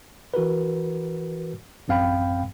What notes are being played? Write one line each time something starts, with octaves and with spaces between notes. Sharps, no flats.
E3 F#4 A#4 B4
A1 F#2 C4 F5 G5 B5